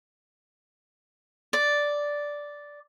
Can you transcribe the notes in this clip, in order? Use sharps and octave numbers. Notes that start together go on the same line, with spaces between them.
D5